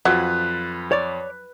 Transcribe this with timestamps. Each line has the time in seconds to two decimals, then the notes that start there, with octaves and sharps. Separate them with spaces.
0.05 F2 F#3 F4 B4
0.92 C#5 D5